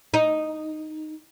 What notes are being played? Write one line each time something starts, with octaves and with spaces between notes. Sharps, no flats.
D#4